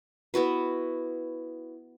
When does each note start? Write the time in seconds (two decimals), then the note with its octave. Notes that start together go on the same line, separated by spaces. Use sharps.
0.34 B3 E4 F#4 B4